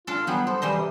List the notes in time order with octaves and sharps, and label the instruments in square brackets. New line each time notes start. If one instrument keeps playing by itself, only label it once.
[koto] D4 A4 [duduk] F4
[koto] F#3 G3 G#4 [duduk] B3
[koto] A4 [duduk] C5
[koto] E3 C5 D#5 [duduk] G3
[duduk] C3